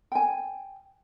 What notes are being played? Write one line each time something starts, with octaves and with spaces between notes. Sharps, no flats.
G5 G#5